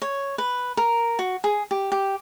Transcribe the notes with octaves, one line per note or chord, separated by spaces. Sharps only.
C#5
B4
A#4
F#4
G#4
G4
G4